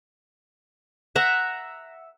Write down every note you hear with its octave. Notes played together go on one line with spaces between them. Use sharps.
E5 F#5 A#5